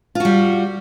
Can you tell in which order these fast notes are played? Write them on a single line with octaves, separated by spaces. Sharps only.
F4 F#4 G3